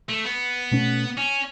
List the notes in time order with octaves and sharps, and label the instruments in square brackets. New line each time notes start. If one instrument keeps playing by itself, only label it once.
[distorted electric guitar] A3
B3
[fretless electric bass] B2 A3 C#4
[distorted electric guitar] C#4